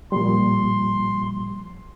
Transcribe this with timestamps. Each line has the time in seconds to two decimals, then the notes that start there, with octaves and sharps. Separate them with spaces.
0.12 A#2 F3 G3 C6